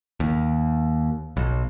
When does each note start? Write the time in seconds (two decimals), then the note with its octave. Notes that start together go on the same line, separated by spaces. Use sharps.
0.20 D#2
1.37 B1